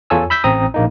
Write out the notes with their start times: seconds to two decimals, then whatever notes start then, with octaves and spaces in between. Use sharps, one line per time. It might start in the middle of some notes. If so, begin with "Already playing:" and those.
0.10 E2 F4 A4 C#5 G#5 E6
0.30 B5 E6 G6 B6
0.44 A1 C4 A#5 D#6
0.74 A#1 A#3 D#4